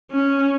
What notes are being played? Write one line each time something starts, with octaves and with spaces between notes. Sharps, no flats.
C#4